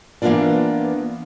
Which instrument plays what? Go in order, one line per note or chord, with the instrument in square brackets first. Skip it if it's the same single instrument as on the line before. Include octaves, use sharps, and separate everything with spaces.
[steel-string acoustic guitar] E3 A#3 B3 D4 F4 D5